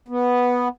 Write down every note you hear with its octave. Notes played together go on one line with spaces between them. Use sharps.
B3